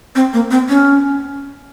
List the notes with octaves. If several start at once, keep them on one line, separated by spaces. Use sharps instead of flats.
C4
A#3
C4
C#4